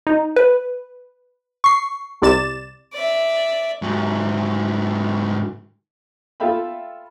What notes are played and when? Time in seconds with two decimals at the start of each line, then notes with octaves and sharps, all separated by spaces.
0.07 D#4
0.36 B4
1.64 C#6 C7
2.22 C2 C3 D5 A6 E7
2.93 D5 E5
3.82 G#2 F#3
6.40 F4 A4 E5 F5 G5 B5